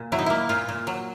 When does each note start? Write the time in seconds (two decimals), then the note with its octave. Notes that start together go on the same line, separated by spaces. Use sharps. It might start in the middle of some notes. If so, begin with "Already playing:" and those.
Already playing: A#2
0.12 F#3 E4
0.19 D#4
0.26 A#3 E4
0.49 A#2 F4
0.69 A#2
0.87 F#3